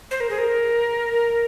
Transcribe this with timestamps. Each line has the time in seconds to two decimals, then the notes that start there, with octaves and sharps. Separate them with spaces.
0.11 C5
0.20 A#4
0.30 G#4
0.38 A#4